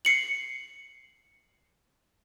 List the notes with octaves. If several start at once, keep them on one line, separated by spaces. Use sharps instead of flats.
C7 C#7 F#7